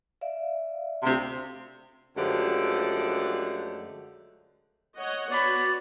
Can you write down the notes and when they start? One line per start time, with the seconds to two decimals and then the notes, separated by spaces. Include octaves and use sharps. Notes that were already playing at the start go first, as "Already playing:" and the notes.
0.21 D5 E5 F5
1.03 D2 C3
2.16 F#2 D3 F3 G#3 A3 G4
4.97 C#5 D#5 F#5
5.31 B3 F#4 C#5 D5 B5